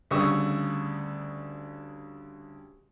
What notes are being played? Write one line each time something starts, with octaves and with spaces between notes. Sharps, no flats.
D2 C#3 G3 C#6 D#6 E6